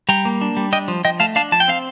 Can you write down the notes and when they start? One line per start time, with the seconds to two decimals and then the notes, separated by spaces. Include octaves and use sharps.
0.09 G3 G5 A#5
0.25 A#3
0.41 D4
0.57 G3
0.72 D4 D#5 G5
0.88 F3
1.05 F3 D#5 G5
1.20 A3 F5 A5
1.36 D4 F5 A5
1.52 F3 A5
1.60 G5
1.68 C4 F5